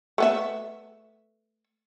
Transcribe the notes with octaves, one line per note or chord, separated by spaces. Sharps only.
A3 B3 E5